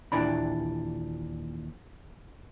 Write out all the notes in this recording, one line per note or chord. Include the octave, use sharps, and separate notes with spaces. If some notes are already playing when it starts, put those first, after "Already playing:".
D#2 A#2 E3 D4 B5